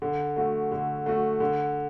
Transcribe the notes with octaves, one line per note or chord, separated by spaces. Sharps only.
D3
A3 F#4
D3
A3 F#4
D3